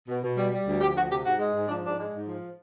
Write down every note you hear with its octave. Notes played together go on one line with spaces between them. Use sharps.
B2
B2
G3
G3
D2
F3 G4
D2 F#4
C3 G4
G#2 F#4
G#3
G#2
F3 D4
G#2 D4
G#3
G#2
F3